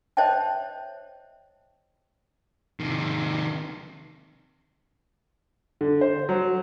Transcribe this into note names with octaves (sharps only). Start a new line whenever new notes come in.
C5 C#5 D#5 E5 G5 A5
C3 D#3
D3
C5
F#3